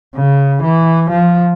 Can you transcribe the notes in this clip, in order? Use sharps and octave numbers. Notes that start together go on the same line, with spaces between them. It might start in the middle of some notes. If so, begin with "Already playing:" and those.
C#3
E3
F3